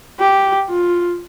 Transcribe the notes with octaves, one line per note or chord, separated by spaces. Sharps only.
G4
F4